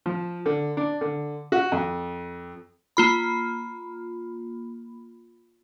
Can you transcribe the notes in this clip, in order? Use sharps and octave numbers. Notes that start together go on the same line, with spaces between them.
F3
D3
D4
D3
F#4
F2
A#3 F4 B5